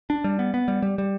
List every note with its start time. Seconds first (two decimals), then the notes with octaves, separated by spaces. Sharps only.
0.10 D4
0.24 G3
0.39 B3
0.54 B3
0.68 G3
0.82 G3
0.98 G3